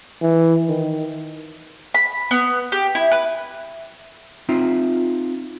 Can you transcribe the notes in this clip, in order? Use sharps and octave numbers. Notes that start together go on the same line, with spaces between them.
E3
D#3
B5
B3
G4
E4
B4
C4 D#4 F4 E5